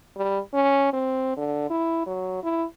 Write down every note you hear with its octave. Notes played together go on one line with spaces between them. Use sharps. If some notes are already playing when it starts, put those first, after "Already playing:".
G3
C#4
C4
D3
E4
F#3
E4